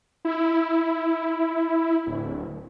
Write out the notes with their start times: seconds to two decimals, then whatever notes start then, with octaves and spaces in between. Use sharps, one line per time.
0.25 E4
2.06 D1